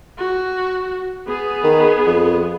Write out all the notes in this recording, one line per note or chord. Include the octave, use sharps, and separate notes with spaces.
F#4
B3 G#4
D#3
F2